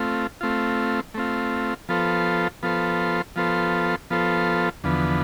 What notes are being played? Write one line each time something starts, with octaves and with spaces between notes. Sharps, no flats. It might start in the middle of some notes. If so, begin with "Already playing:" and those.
Already playing: A3 C4 F4
A3 C4 F4
A3 C4 F4
F3 B3 F4 A4 C5
F3 B3 F4 A4 C5
F3 B3 F4 A4 C5
F3 B3 F4 A4 C5
E2 D3 F3 B3